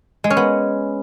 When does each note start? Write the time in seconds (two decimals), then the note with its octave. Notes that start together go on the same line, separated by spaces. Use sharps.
0.24 G#3
0.30 C#4
0.37 B3